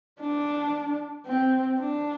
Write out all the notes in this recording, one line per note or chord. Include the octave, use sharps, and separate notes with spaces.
D4
C4
D4